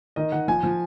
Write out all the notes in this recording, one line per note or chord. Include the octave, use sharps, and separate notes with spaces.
D#3 D#5
D#3 F#5
F3 G#5
F3